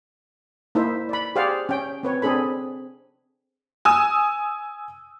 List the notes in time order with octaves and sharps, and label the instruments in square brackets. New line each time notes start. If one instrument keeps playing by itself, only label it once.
[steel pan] A#3 D#4 E4 C5 E5
D5 B5
G4 G#4 C5 D5 F5 F#5
C#4 G5
C4 B4 C#5
C4 D4 G#4 A4 B5
[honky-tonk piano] G#5 D#6 E6